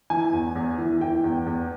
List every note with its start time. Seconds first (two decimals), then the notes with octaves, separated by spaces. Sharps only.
0.10 E3 G#5
0.33 E2
0.55 E2
0.78 E3
1.01 E3 G5
1.24 E2
1.46 E2